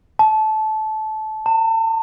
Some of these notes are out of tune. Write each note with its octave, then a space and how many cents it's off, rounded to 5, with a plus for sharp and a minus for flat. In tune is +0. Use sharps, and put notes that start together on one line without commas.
A5 -20
A5 +40